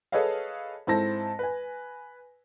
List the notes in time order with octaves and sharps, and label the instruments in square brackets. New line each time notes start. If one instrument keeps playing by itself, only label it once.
[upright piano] G#4 A4 B4 C#5 D#5 F5
G#2 C4 E4 A4 A5 A#6
B4 G#5